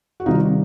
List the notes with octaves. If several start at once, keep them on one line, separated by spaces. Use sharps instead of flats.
F#4
C3 D#3 G3 D#4 F4